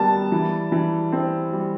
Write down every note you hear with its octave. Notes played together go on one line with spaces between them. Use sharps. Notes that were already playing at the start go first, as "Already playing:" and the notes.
Already playing: D#3 G3 B3 A5
E3
E3
C4
G3